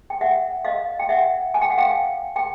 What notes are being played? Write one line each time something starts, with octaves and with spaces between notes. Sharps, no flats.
G5
E5 F#5
D#5 F5
G5
E5 F#5
G#5
G5
F#5
F5 G5
G5